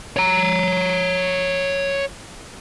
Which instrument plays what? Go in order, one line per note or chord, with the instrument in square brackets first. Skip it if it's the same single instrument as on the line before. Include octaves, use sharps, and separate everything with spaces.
[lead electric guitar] C#5 A#5